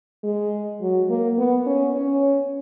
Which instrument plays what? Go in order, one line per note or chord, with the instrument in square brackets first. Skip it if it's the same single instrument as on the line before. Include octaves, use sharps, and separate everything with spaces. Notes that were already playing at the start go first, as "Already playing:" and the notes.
[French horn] G#3
F#3
A#3
B3
C#4
C#4